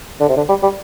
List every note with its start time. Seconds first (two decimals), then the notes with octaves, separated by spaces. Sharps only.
0.20 D3
0.29 C3
0.37 D3
0.49 G3
0.63 G3